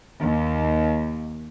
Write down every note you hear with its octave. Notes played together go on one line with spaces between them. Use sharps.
D#2